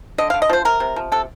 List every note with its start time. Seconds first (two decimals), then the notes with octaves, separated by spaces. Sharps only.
0.18 D3 D#5
0.30 F5
0.34 D3
0.42 D#5
0.49 F3 C5
0.65 C3 A#4
0.80 C3
0.96 F3
1.12 C3 A4